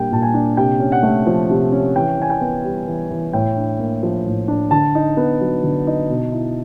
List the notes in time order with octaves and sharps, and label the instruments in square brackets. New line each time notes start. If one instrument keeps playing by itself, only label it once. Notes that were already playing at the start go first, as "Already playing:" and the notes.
Already playing: [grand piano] A#2 G3 A#3 D4 G5
A#2 A5
G#5
D4
C3 G5
C#4
F#5
A3
F3
C3
C#4
E3 G5
E3 G#5
G5
B3
G3
E3
E3
A2 G5
D4
A#3
F3
A2
D4
D3 A5
D#4
B3
F#3
D3
D#4
B2
E4